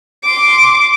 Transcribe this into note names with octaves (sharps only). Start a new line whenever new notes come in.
C6 D6